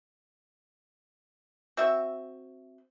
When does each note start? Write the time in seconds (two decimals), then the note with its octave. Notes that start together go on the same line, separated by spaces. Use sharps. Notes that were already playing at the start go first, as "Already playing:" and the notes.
1.77 C4 F#4 E5